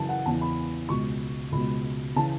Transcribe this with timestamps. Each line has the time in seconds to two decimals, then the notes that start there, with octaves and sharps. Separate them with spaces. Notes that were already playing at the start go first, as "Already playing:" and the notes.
Already playing: F#2 C#3 E3 A5
0.09 F#5
0.26 E2 C#3 E3 A5
0.41 B5
0.89 C#2 B2 C#6
1.52 C#2 B2 B5
2.16 C#3 E3 A5